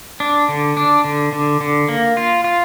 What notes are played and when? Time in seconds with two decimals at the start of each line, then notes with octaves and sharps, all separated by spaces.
0.20 D4
0.49 D3
0.77 D4
1.05 D3
1.33 D3
1.61 D3
1.88 A#3
2.17 F4
2.44 F4